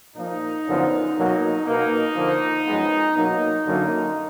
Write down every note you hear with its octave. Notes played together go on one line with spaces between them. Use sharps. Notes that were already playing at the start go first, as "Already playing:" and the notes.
A#2 F3 A#3 D#4
F#2 D3 F3 B3
B2 F#3 A#3
B2 A#3 D#4
D3 F3 A#3
F#2 F3 G#3 B3
B2 F#3 A#3 D#4
F#2 D3 F#3 A#3